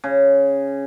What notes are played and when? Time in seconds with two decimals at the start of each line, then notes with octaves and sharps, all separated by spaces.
0.04 C#3